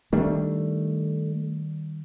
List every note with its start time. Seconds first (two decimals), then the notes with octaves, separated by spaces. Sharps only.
0.13 D#3 G3 A3 D4